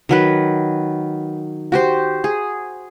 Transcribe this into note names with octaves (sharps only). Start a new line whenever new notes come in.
D#3 F#3 B4
F#4 G4 C5
G#4